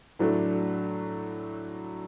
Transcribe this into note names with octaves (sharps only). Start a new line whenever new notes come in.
A2 F#3 A3 D4